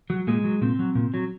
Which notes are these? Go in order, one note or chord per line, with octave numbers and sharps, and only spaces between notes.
F#3
A#2 G#3
F#3
A#2 C4
F#3
A#2
F#3